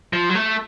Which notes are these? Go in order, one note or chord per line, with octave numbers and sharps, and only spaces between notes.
F3
F#3
A3